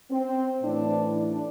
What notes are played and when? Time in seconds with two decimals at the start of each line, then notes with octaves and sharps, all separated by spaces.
0.11 C4
0.63 A2 E3 D4
1.16 D4